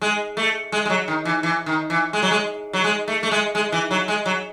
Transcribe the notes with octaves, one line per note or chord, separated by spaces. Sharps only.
G#3
A3
G#3
G#3
F#3
D#3
E3
E3
D#3
E3
G#3
F#3
G#3
F#3
G#3
A3
A3
G#3
G#3
E3
F#3
G#3
F#3